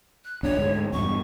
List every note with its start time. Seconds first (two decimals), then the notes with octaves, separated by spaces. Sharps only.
0.25 F#6
0.43 B1 E2 D4 C#5
0.57 D2 G#2
0.93 E2 G2 B2 C#6